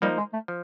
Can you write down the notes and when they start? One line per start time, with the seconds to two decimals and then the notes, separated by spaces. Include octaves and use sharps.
0.02 F3 G3 A#3 D#4
0.17 G#3
0.33 A3
0.48 F3